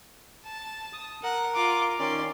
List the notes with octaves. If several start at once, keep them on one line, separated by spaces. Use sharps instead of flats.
A5
D#6
A#4 F#5
F4 D6
D#3 C#4 D5 C6